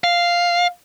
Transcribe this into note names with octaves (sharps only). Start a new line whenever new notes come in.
F5